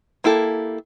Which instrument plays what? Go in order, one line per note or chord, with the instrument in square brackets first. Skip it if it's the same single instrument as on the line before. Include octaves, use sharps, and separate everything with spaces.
[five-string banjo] A#3 E4 G4 A4